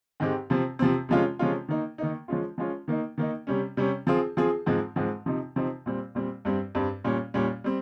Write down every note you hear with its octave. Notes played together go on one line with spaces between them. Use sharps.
G#2 D#3 G#3 C4 G4
C3 F3 C4
C3 F3 C4
C3 F3 G#3 C#4 F4
C3 F3 G#3 C#4 F4
D#3 A#3 D#4
D#3 A#3 D#4
F3 G#3 C#4 F4
F3 G#3 C#4 F4
D#3 A#3 D#4
D#3 A#3 D#4
C3 G3 C#4
C3 G3 C#4
F3 C4 F4 G#4
F3 C4 F4 G#4
G#2 F3 G#3 C4
G#2 F3 G#3 C4
C3 F3 C4 D#4
C3 F3 C4 D#4
A#2 G3 C4
A#2 G3 C4
G2 G3 C4
G2 G3 C4
A#2 G3 C#4
A#2 G3 C#4
G3 C4